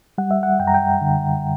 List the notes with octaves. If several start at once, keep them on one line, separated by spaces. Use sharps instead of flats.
G3 F#5
E5
F#5
F#2 G5
A#5
G5
D3